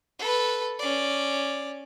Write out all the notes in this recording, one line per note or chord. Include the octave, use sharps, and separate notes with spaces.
A4 B4
C#4 D5